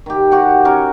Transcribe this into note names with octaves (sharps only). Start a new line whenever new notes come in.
D#3 G4
F#4 G4 F#5
C#4 F#4 A#4